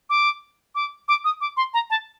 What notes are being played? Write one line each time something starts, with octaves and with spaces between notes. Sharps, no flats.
D6
D6
D6
D#6
D6
C6
A#5
A5